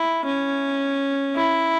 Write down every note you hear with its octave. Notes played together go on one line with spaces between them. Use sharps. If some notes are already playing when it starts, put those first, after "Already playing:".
Already playing: E4
C#4
E4